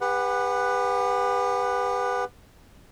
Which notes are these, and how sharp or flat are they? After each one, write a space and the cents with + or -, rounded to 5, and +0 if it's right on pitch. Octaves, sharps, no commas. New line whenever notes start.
G4 +40 B4 +0 F#5 +0